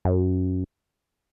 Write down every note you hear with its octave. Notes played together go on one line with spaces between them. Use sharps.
F#2